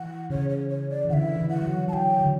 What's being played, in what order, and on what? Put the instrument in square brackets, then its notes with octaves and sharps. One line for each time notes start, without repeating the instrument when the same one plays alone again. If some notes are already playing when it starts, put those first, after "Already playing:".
Already playing: [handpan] E3 [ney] F#5
[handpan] C#3 [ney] C#5
[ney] C#5
C#5
D5
[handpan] E3
[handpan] D3 [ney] F#5
[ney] E5
[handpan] E3
[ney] F#5
[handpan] F#3
[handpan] F#3 [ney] A5
[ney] G5
[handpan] D3